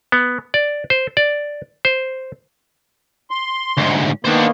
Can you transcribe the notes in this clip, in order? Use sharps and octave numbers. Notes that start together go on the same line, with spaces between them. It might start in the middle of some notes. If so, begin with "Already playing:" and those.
B3
D5
C5
D5
C5
C6
D2 G#2
D#3 A#3 B3 D4 C5